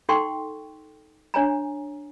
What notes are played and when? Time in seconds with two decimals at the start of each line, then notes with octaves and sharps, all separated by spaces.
0.09 D#4 A4 F#5 G5 C6 C#6
1.34 D4 C#5 G#5 A#5